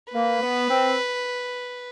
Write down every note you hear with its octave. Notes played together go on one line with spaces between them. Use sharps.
A#3 B4
B3
C4